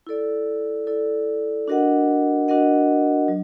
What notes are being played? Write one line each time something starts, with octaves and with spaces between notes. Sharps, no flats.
E4 A4 D5
E4 A4 D5
D4 F#4 A#4 D#5 F#5
D4 F#4 A#4 D#5 F#5
F#3